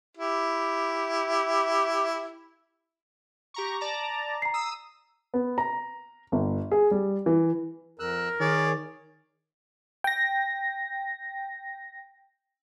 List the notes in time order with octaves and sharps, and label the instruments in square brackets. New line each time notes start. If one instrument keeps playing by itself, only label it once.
[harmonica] E4 G4
[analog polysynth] G4 A#5 C#6
D5 A5 A#5
[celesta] A#5 C7
[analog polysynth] D#6 E6
[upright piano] B3
A#5
G1
G#4
G3
E3
[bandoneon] F2 E6 F#6 [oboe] A#4
[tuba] D#3 [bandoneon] G#4 C#5 [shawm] D5
[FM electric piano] G5 A#6